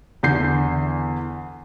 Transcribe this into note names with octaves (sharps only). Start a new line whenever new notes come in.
E2 D3 G6 C7